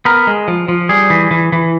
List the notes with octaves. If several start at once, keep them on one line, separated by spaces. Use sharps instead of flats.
B3 A#4
G#3
F3
F3
G3 G#4
E3
E3
E3